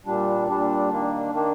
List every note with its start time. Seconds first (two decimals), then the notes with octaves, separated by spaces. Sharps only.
0.06 A#2 G3 D4
0.48 A#2 G3 D4
0.90 D#3 A#3 D4
1.32 D#3 A#3 D4